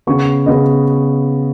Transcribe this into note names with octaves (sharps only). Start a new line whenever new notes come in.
C#3 B3 C#6
C#3 B3 D#5